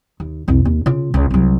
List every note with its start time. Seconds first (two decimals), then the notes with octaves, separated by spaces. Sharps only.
0.20 D#2
0.48 C2 F2
0.65 D#2
0.86 C#3 F4
1.14 C#2
1.31 C2 F#3